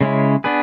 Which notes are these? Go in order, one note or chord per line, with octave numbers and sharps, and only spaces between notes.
C#3 G#3 C#4 E4
B3 D4 G#4 B4